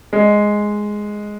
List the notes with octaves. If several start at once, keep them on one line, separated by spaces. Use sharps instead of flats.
G#3